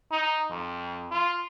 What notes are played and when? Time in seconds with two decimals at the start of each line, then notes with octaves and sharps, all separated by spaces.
0.12 D#4
0.50 F2
1.11 F4